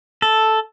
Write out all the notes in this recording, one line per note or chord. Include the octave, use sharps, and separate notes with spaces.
A4